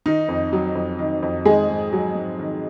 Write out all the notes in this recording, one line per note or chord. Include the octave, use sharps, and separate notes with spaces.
D#3 D#4
F2
F#3
F2
D#3
F2
D#3 G#3 G#4
G#2
F#3
G#2
D#3